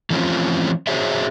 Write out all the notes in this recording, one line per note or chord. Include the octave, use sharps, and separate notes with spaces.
E3 F3 A3 C4 C#4 F4
F#4 G#4 C5 C#5 E5